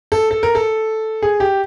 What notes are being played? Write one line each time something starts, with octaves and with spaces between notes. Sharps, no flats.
A4
A4
A#4
A4
G#4
G4